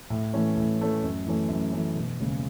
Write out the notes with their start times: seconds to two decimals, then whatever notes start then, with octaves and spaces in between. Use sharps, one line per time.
0.10 A2
0.34 E3 A3 C#4
0.57 A2
0.79 E3 A3 C#4
1.03 F#2
1.27 E3 A3 C#4
1.48 F#2
1.72 E3 A3 C#4
1.95 E1
2.19 D#2 C#3 G#3